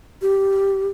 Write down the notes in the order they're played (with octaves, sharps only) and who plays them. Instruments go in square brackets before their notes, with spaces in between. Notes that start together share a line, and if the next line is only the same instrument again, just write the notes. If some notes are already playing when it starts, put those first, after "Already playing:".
[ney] G4